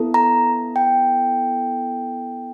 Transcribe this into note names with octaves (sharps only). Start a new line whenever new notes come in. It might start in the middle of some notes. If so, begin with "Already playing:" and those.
Already playing: B3 E4 A4
A#5
G5